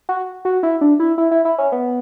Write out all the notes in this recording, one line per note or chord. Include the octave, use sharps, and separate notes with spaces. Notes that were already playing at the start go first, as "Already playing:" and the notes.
F#4
F#4
E4
D4
E4
E4
E4
E4
C#4
B3